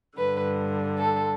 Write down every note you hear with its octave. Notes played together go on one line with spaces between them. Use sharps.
G2 D3 B4
A4